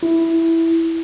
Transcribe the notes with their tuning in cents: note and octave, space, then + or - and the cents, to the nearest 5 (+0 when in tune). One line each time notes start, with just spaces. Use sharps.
E4 +0